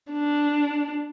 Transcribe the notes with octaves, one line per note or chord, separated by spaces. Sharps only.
D4